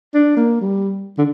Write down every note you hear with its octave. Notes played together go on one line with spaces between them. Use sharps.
D4
A#3
G3
D3